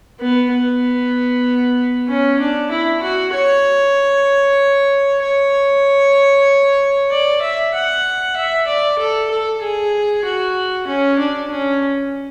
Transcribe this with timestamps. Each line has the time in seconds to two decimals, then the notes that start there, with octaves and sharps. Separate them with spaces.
0.20 B3
0.51 B3
2.08 C#4
2.40 D4
2.71 E4
3.02 F#4
3.34 C#5
5.22 C#5
7.10 D5
7.41 E5
7.74 F#5
8.36 E5
8.67 D5
8.98 A4
9.30 A4
9.62 G#4
10.24 F#4
10.87 C#4
11.18 D4
11.50 C#4